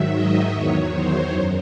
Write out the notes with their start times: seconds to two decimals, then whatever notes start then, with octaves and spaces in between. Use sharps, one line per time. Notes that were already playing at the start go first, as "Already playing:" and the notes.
Already playing: G#2 D#3 F#3 E5
0.13 D#5
0.52 E2 D#3 F#3 C#5
0.92 C5
1.31 F#2